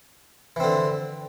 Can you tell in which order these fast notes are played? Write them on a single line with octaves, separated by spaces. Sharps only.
E3 C4 D3